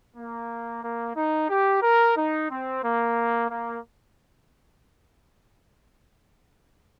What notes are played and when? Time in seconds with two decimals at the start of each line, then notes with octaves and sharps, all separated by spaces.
0.16 A#3
0.83 A#3
1.16 D#4
1.50 G4
1.82 A#4
2.16 D#4
2.50 C4
2.83 A#3
3.49 A#3